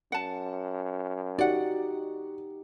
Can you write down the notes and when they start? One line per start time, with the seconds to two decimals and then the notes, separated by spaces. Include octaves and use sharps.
0.12 F#2 F#5 A5
1.39 D#4 F#4 G4 D5 F#5